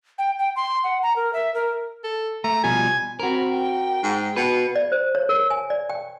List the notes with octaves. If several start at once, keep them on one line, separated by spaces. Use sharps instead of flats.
G5
G5
C6
F#5
A#5
A#4
E5
A#4
A4
A3 A#5
B2 F3 G3 G#5
C4 F#4 A#4 B5
G5
G#2
B2 B4
D5
C5
C#5
A#4
G#5
D5
G5